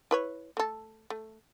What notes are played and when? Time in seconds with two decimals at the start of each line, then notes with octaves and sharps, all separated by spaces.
0.11 E4 B4 C#5
0.57 A3 A4
1.10 A3